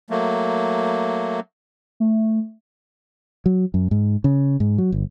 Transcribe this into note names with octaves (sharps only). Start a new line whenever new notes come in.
F#3 A3 A#3
A3
F#3
F#2
G#2
C#3
G#2
F#3
G1